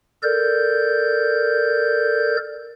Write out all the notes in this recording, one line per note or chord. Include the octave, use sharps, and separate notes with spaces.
A4 A#4 D5 G6